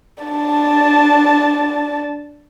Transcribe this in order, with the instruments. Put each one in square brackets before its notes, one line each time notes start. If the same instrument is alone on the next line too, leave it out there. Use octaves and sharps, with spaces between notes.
[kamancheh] D4 A5